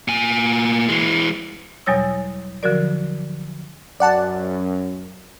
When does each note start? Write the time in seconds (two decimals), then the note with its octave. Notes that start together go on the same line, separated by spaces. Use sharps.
0.08 A#2 G#5
0.89 E3 G#3
1.86 E2 B2 F#3 G3 C#5 E6
2.63 D3 F3 F#3 F#4 A#4 D5
4.00 F#2 D5 F#5 A5